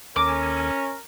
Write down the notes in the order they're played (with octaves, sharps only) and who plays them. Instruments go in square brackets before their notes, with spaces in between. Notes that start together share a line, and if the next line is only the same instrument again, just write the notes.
[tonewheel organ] D#2 A4 G#5 [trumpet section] C#4 [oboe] A#4 [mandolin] D6